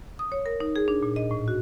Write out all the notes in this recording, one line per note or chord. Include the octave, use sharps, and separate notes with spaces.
D#6
C#5
A#4
D#4
G#4
D4
A#2
D#5
A2
F#4